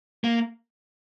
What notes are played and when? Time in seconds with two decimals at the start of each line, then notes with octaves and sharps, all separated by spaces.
0.24 A#3